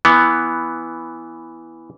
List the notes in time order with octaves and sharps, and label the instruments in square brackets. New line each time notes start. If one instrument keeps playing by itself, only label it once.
[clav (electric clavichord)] E3 B3